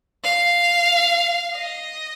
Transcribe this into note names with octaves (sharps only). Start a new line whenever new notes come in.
F5
D#5